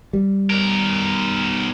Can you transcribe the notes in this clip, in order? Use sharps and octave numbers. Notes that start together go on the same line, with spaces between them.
G3
B1 A#4